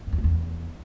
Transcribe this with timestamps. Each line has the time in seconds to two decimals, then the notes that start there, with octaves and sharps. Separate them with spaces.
0.07 G2
0.13 E2
0.18 A2
0.24 E2